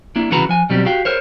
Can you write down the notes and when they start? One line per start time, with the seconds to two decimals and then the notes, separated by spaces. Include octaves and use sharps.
0.16 A#3 D4 E4
0.31 C2 C#3 E3 F#4 B4 A#5
0.49 F3 G#5
0.70 B2 F#3 G3 C4 G4
0.86 F#4 G4 F5 G5
1.05 A#4 C5 C#5